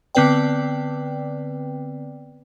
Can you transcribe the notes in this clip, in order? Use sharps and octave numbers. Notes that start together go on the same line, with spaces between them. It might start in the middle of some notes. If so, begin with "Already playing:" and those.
D3 B3 C4 B4 D5 G5